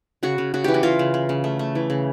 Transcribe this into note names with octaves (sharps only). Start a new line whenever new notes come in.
C#3 F#4
C#3
C#3 F#4
E3 G4
F#4
E3 F4
C#3
C#3
C#3
A3
A3
E3
C#3